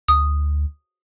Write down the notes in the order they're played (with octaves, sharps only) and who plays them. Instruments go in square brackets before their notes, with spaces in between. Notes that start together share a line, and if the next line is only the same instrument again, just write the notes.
[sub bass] D2 [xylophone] D#6